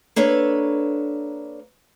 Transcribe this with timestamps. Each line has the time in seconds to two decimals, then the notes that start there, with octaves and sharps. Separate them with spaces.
0.16 A#3 D4 A4 B4 C#5